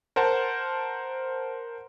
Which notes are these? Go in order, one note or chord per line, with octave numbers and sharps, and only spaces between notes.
A#4 C5 F#5 A5